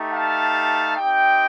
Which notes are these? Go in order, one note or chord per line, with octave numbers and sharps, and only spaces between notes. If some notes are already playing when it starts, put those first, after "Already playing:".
Already playing: A3 D#4 G4
F5 A5
C4 D#4 G4 D#5 G5